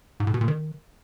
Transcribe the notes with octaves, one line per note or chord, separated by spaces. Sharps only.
G#2
A2
B2
A#2
D#3